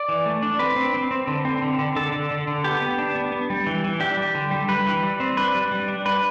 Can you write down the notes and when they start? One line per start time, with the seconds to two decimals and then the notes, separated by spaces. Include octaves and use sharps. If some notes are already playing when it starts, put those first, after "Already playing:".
Already playing: D5
0.09 E3
0.26 A3
0.42 D4
0.59 C4 B4
0.76 C4
0.94 C4
1.11 C4
1.27 D3
1.45 C4
1.62 D3
1.79 D3
1.96 D3 A4
2.13 D3
2.31 D3
2.47 D3
2.64 B3 G4
2.82 B3
2.98 D4
3.15 B3
3.32 B3
3.50 G3
3.67 E3
3.84 E3
4.00 D4 G4
4.17 G3
4.35 D3
4.51 G3
4.69 G3 B4
4.86 E3
5.03 G3
5.20 C4
5.37 D4 B4
5.55 G3
5.72 G3
5.88 D4
6.05 D4 B4